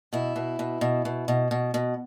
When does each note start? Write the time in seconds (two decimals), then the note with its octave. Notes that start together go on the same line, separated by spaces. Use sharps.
0.13 B2 E4
0.36 B2
0.59 B2
0.81 B2
1.05 B2
1.28 B2
1.51 B2
1.74 B2